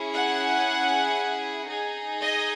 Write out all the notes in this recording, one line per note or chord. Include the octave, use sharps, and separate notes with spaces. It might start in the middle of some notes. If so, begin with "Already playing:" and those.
Already playing: C#4 E4 G#4
F#5
D#4 G#4
D#5